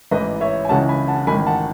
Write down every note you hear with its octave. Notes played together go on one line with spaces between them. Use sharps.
A1 G#2 E3 B4 D#5
C#5 E5
G#5
C#2 C#3 E3 F#5 A5
G#5 B5
F#5 A5
A1 G#2 D#3 G#5 B5
F#5 A5